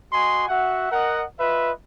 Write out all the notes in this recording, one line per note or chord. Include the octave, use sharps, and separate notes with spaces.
F#4 D#5 G#5 C6
F#4 E5 F#5
A#4 D#5 F#5
F4 B4 D#5 E5